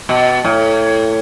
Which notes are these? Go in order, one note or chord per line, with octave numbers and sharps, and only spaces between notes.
B2
A2